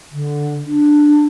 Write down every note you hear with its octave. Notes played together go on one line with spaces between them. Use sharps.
D3
D4